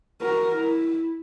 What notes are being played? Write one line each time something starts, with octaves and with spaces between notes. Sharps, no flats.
F#4 A#4
E4